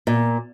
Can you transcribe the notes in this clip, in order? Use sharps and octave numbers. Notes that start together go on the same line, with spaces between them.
A#2